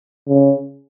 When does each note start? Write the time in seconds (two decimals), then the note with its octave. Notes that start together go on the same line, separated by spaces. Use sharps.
0.28 C#3